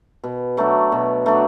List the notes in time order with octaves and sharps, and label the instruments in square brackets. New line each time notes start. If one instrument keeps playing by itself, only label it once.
[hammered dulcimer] B2
F#3 A3 D4
B2
F#3 A3 D4